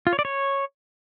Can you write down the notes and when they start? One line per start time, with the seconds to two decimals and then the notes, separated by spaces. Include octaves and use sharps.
0.07 F4
0.13 C#5
0.19 D5
0.25 C#5